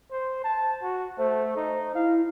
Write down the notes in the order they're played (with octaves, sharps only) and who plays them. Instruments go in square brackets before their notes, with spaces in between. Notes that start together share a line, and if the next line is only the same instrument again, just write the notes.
[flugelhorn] C5
A5
F#4
[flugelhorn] A3 [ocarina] C5
[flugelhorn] D#4
[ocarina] E4 [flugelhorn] F5